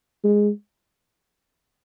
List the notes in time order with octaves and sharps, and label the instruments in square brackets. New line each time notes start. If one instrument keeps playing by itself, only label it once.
[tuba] G#3